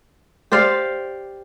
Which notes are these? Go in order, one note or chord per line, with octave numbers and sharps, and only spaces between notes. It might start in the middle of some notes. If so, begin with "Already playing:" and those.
G4 C5 D5 F5